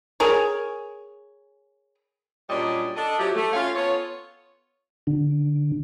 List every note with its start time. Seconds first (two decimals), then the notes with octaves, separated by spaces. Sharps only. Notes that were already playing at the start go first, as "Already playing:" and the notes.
0.20 G#4 A#4 C#5
2.50 F#2 A#2 G3 D4 C#5 D#5
2.96 D4 A4 D#5
3.19 F3 F#3 A3 G4
3.36 A3
3.53 C#4 F4 C#5 F5
3.75 B3 F4 A4 C#5
5.07 D3